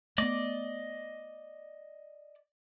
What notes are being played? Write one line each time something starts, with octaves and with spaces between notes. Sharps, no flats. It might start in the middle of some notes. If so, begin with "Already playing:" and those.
A3 B3 D5 D#5 D6